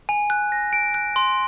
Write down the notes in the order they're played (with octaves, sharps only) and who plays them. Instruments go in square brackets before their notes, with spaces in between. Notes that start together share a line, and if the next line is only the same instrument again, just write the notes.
[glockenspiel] G#5
F#6
A#6
D7
F#6
C6